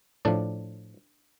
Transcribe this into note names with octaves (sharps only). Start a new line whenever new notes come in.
A2 F3 D4 D5